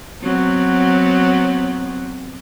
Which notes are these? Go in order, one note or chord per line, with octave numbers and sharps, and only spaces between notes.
F#3 B3 C4